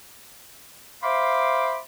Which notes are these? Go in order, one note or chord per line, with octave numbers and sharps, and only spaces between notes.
C5 E5 F5 B5 C6 D6